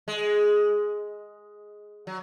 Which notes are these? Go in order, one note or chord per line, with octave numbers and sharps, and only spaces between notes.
G#3
F#3